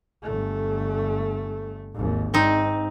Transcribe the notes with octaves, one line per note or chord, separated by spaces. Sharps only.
G1 A3
G#1 D#2
G#2 C4 D#4